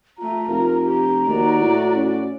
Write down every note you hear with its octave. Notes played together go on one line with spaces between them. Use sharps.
A3 F4 A#5
F1 F4 A#4
G4 A#5
D#2 D#3 F#4 D5
A2 E4
C#4